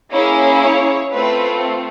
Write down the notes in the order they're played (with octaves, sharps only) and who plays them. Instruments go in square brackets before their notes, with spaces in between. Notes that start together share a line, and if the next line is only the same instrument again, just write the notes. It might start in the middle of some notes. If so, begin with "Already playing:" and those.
[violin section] A#3 C#4 E4 G#4 C#5
C#5
A3 C4 F4 B4